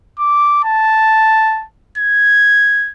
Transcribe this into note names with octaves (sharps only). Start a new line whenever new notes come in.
D6
A5
G#6